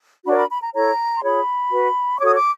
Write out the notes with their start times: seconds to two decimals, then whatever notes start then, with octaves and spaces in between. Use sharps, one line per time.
0.25 D4 F#4 A#4 C#5 B5
0.38 B5
0.50 B5
0.62 A#5
0.74 E4 A4 C#5 A#5
1.16 C6
1.22 F4 G#4 C#5 B5
1.71 F#4 B4
2.15 C#6
2.20 F#4 A4 C#5 D6
2.28 D#6
2.35 D6